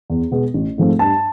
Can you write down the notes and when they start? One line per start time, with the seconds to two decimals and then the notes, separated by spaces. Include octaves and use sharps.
0.10 E2
0.31 B2 G#3 B3
0.54 A1
0.78 G#2 F3 A3 C4
0.99 G2 A5